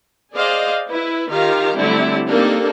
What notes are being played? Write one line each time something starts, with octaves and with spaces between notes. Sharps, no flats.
G#4 C5 D5 D#5 F5
E4 B4
D#3 F4 G4 F5 A#5
D3 F#3 G3 A3 C4 E4
A#3 C4 D4 D#4 G4 A4